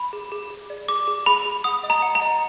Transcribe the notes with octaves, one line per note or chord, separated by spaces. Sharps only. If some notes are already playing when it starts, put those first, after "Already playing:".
Already playing: B5
G#4
G#4
G#4
D5
G#4 D6
G#4
G#4 B5
G#4
F#5 D#6
D#5
A#5
F#5
A#5
D#5